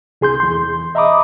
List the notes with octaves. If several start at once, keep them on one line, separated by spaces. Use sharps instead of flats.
C2 G#4 C6 G6
E2 C6
D#5 E5 A#5 B5 D6 D#6